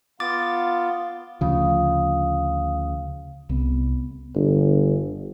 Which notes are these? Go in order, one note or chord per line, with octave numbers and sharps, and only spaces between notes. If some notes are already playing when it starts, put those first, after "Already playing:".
B3 F4 F5 D6 A6
D2 C#3 F3 F5 D#6
C2 B3
G1